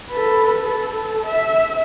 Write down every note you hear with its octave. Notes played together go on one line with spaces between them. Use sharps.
A4 B4
A4
E5